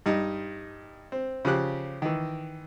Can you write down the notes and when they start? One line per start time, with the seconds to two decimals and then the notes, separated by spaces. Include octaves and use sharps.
0.06 G2 D#4
1.12 C4
1.45 C#3 F3 G4 F#6
2.02 D#3 E3